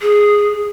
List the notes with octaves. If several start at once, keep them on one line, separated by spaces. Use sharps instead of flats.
G#4